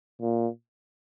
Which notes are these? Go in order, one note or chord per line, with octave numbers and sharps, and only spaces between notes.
A#2